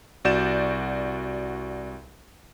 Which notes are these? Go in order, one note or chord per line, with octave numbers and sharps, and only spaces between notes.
C2 F#4 D5 G6 A6 E7